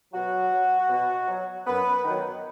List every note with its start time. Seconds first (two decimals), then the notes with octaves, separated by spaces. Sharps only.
0.13 B2 F#3 F#4
0.51 F#3
0.90 B2
1.29 F#3
1.66 F#2 B3 B4
2.05 D#3 F#3